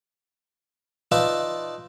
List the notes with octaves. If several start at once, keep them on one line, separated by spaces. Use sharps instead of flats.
D#4 F4 B4 D5 E5 A5